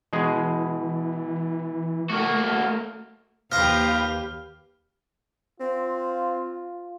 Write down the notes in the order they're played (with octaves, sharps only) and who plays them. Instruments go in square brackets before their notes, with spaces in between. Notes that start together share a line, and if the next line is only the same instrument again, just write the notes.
[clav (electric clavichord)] B2 G#3 G#4 [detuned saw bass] E3
[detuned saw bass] A3 [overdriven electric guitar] A#3 F#4
[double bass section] D#2 [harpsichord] F3 A#5 [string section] G4 B4 F5 [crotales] F6
[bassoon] C4 [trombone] F4